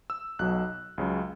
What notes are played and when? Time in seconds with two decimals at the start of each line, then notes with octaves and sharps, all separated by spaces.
0.10 E6
0.39 B1 B2 F#3 F#6
0.98 C#2 C#3 F#3